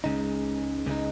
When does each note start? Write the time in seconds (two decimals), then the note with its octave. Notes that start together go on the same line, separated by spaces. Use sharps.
0.04 C#2 C#3 G#3 D#4
0.86 C#2 C#3 G#3 D#4